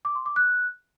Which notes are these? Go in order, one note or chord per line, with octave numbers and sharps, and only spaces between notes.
D6
C6
D6
F#6